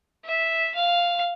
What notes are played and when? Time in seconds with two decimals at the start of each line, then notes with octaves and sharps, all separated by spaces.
0.25 E5
0.75 F5